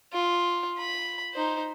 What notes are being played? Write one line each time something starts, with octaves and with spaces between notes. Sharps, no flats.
F4
B5
D#4 C5